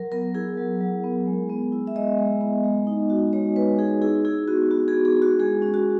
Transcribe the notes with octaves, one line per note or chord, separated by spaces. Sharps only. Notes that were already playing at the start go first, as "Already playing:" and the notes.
Already playing: F#3 A#4
B3 A#4
E4 G#4
F#3
F#3
B3
G#3
B3
E4
E5
G#3 D#5
G#3
B3
G#3
D#4
F#4
G#3 C#5
G#3 B4
D#4 G#4
E4 G#4
E4 G#4
B3 F#4
B3 F#4
G#4
E4
G#4
E4
F#4
G#3 G#4
C#4
F#4